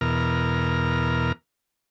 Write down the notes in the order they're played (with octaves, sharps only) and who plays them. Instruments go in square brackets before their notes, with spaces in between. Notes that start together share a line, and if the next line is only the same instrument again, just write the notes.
[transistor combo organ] E2 B2 A#4 F6